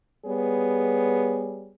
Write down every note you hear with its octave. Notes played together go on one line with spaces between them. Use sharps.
G3 B3 G#4 C#5